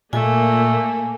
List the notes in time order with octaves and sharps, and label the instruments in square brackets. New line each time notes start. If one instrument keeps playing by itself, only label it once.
[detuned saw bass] A#2 [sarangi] A3 [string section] A#3 [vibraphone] G#5